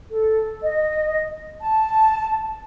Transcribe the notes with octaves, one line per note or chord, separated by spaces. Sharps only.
A4
D#5
A5